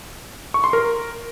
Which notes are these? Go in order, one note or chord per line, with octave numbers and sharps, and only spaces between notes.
C#6
C6
A#4